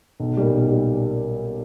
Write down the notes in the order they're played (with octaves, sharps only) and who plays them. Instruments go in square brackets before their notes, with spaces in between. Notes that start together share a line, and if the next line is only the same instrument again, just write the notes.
[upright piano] B1
A#2 G3
B1
G3